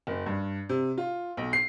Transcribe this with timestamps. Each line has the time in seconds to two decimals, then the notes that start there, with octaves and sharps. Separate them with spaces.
0.07 F#1
0.26 G2
0.69 C3
0.98 F4
1.37 B1
1.53 C7